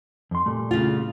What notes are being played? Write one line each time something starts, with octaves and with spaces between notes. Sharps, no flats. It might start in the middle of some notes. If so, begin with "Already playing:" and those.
F2 C6
A#2 G3 A3
C#3 F4